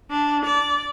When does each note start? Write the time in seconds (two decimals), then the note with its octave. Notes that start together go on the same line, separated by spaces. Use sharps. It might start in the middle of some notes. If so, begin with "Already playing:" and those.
0.10 D4
0.45 D5